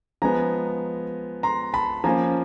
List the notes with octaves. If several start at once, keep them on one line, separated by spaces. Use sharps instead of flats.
F3 G#3 B3 G#5 A#5
A#5 C6
A5 B5
F3 A#3 C#4 G#5 A#5